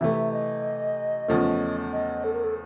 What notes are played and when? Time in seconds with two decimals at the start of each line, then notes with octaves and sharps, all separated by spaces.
0.01 C3 E3 A3 E5
0.32 D#5
1.28 E2 C#3 F3 A3
1.92 D#5
2.24 A4
2.33 A#4
2.44 A4